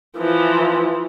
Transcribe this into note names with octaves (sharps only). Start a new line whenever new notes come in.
E3 F3